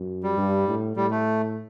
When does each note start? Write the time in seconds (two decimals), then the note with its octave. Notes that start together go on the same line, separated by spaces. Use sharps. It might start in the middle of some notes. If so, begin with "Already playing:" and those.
Already playing: F#2
0.23 G3
0.37 G2
0.68 A2
0.96 A2 G3
1.11 A3